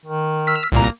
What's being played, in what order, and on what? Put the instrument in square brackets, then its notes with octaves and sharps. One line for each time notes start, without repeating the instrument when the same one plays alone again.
[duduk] D#3
[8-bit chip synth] E6 F6 B6
[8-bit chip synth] C2 A#2 A#5 [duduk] A#3